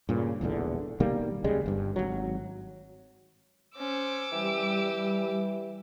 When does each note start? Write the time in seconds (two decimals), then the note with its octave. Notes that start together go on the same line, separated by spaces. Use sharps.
0.09 G2 A#2 C#3
0.41 E1 A#1 E2 D3
1.00 B2 D#3 G3 A#3
1.44 D#2 C#3 G3 G#3
1.66 G1 G2
1.96 G#1 F#3
3.77 C#4 C5 D6 E6
4.32 E3 G3 G4